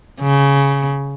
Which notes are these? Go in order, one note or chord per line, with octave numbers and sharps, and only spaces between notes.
C#3